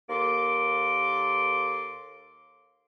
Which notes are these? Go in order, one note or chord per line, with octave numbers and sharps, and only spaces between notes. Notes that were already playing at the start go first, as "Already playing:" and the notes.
D#2 A#3 A4 C6 D6